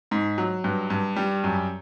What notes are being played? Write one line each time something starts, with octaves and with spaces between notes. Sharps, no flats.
G#2
F#3
G2
G2
G3
F#2